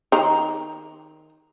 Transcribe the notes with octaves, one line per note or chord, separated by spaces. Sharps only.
D#3 A#5